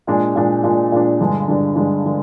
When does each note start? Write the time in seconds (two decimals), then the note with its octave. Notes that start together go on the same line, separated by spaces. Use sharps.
0.07 A#2 G#3 D4
0.36 A#2 G#3 D4
0.64 A#2 G#3 D4
0.92 A#2 G#3 D4
1.20 G2 D3 G#3 D4
1.48 G2 D3 G#3 D4
1.76 G2 D3 G#3 D4
2.05 D3 G#3